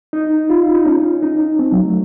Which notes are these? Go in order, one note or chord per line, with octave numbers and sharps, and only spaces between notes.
D#4
F4
D#4
C#4
D#4
C4
F#3
A3